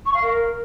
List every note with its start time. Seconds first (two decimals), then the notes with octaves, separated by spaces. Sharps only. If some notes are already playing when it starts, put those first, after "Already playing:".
0.05 C#6
0.14 F5
0.22 A#4